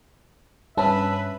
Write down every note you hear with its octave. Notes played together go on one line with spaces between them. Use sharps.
G2 C#4 B4 E5 A5